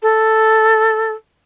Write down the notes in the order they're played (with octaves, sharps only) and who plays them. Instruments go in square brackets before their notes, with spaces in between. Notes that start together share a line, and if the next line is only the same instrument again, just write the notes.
[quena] A4